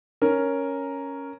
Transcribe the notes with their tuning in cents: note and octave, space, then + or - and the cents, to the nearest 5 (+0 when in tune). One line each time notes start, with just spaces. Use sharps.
C#4 +0 A#4 +0